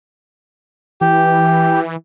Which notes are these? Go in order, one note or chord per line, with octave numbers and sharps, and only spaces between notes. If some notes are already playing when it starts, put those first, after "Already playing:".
E3 G4